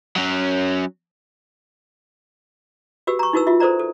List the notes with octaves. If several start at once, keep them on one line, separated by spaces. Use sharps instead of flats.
F#3 C#4
F#4 G4 B4 E6
A#5 C#6
D#4 E4 F#4 A#4 B4 E6
F4 F#4 E5
A4 A#4 C5 D5 A#5
A4